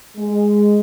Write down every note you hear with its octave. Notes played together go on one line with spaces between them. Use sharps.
G#3